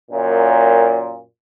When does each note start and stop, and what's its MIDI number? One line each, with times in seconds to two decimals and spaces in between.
0.11 1.22 42
0.11 1.22 46